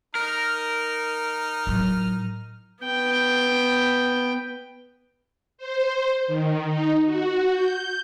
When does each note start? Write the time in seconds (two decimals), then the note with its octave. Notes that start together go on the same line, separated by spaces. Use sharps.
0.15 D#4 A#4 F6
1.67 A2 F#3
2.84 B3 G5
5.58 C5
6.27 D#3
6.65 D#4
7.05 F#4
7.53 G6